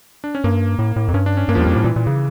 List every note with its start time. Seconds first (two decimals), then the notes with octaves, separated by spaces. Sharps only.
0.24 D4
0.35 C#4
0.44 G2 A#3
0.79 A2
0.96 A2
1.08 F2
1.14 G2 C#4
1.26 D4
1.37 C#4
1.48 G2 A#3
1.55 E2 F3
1.61 G3
1.66 F2
1.72 F3
1.76 A2
1.83 A#2 E3
1.96 A#2
2.07 C#3